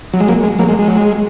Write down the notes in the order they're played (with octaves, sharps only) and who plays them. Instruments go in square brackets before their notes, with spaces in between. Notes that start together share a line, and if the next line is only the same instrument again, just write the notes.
[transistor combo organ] F#3
G#3
F#3 A#3
G#3
F#3 A#3
G#3
G#3
F#3
G#3